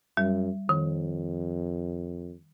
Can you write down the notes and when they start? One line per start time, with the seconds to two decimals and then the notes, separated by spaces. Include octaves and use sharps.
0.17 F#2 G3
0.69 F2 D#3